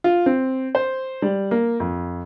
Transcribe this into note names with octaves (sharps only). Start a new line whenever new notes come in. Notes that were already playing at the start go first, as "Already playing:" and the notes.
F4
C4
C5
G3
A#3
F2